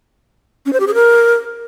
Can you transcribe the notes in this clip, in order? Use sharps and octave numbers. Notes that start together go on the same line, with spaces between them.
C#4
C5
G4
G#4
A#4